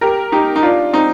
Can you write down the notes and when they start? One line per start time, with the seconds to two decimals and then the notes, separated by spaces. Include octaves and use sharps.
0.01 G4 A#4
0.32 D#4 G4
0.56 D#4
0.62 D4 F4
0.93 C4 D#4